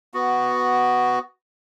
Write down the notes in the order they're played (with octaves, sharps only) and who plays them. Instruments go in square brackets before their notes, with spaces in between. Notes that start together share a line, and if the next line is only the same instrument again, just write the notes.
[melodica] B3 F#4